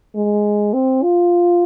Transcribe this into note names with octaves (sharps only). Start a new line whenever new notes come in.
G#3
C4
F4